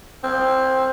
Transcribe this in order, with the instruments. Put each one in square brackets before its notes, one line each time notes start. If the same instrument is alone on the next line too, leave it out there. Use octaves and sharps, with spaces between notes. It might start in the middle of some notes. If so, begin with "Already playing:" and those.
[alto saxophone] C4